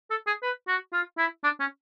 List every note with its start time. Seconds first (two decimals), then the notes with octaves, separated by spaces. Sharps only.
0.10 A4
0.26 G#4
0.42 B4
0.68 F#4
0.93 F4
1.18 E4
1.44 D4
1.60 C#4